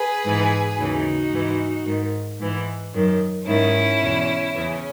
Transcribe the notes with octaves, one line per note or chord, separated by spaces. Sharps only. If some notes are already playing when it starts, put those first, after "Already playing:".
Already playing: G#4 B4
G#2 E3
D#2 C#3 E3 D#4 F#4
G#2 E3
G#2 D#3
G#2 E3
F#2 D#3
G#2 D#3 C#4 E4
E2 B2
E2 C#3 E3 C#4